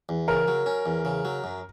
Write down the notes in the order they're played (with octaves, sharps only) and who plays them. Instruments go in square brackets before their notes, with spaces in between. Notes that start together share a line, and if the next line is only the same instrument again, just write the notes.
[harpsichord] E2
[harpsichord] C#3 [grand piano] A#4
[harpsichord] F#3
C#4
E2
C#3
F#3
F#2